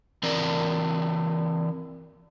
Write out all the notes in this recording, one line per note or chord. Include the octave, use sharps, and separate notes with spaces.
E3 C4 A#4 D5